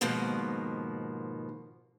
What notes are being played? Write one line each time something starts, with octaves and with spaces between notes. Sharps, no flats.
D#2 G#2 B2 D#3 F3